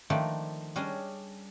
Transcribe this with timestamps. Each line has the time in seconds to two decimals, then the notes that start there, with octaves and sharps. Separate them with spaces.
0.10 D#3 F3 A3 D4 D5 B5
0.76 G3 C#4 D4 G#4 D#5